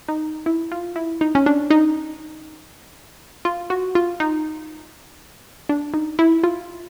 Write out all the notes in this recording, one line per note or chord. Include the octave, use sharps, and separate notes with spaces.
D#4
E4
F4
E4
D#4
C#4
D4
D#4
F4
F#4
F4
D#4
D4
D#4
E4
F4